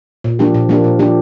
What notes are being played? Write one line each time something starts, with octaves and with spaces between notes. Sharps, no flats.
A#2
F3 A#3 D4 G4
A#2
F3 A#3 D4 G4
A#2
F3 A#3 D4 G4